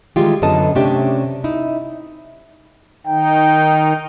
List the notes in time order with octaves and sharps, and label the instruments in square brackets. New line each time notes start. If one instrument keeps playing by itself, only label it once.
[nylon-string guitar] D#3 E3 G3 G#3 F4 G4
F#2 D3 B3 A4 D#5 A5
C3 A3 C#4 D4 G4
D#4 E4
[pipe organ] D#3 D#4 [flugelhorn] G5